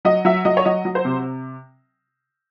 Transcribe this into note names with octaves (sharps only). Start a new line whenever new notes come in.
F#3 D#5
F#3 E5
F#3 D#5
C#5
F#3 D#5
F#3
C5
C3